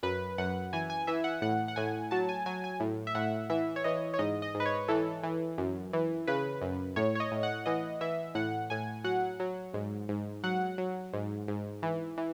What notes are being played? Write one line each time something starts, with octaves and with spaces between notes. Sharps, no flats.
F#2 B4
F#2 F#5
E3 G#5
G#5
E3 E5
F#5
A2 F#5
F#5
A2 G#5
F#3 A5
G#5
F#3 G#5
G#5
A2
E5
A2 F#5
E3 E5
C#5
E3 D#5
C#5
G#2 D#5
D#5
G#2
B4
C#5
E3 A4
E3
F#2
E3
C#3 B4
F#2
A2 C#5
C#5
D#5
A2
F#5
E3 D#5
E3 E5
A2 F#5
A2 G#5
F#3 F#5
F#3
G#2
G#2
F#3 F#5
F#3
G#2
G#2
E3
E3